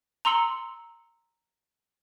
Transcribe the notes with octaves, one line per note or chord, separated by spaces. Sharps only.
A#5 C6 E6 C#7 F#7